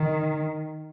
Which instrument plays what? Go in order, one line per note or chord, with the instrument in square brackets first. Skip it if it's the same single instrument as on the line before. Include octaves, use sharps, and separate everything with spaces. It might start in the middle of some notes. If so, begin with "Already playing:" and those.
Already playing: [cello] D#3